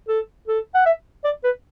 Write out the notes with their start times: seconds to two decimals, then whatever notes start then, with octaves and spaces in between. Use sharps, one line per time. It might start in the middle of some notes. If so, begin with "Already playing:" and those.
0.08 A4
0.47 A4
0.74 F#5
0.86 E5
1.24 D5
1.44 B4